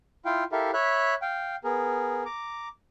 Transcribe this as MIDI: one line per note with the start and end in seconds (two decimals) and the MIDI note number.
0.25 0.44 64
0.25 0.44 65
0.25 0.44 77
0.25 0.44 79
0.52 0.71 64
0.52 0.71 67
0.52 0.71 69
0.52 0.71 70
0.52 0.71 76
0.52 0.71 77
0.74 1.14 73
0.74 1.14 76
0.74 1.14 83
0.74 1.14 90
1.22 1.56 77
1.22 1.56 79
1.64 2.23 59
1.64 2.23 68
1.64 2.23 70
2.26 2.68 82
2.26 2.68 86